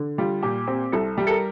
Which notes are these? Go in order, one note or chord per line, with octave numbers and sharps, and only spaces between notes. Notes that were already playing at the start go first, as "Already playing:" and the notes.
Already playing: D3
G3 F4
A#2 G4
C4 G4
C2 A4
G3
A4
A#4